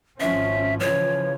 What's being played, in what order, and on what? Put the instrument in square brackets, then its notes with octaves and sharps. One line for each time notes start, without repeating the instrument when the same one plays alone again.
[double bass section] G#1 F3 C#4 [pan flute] E5
[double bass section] C#3 E3 F3 [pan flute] C#5